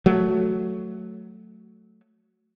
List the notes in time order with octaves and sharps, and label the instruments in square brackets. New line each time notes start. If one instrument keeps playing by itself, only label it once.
[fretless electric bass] F#3 A3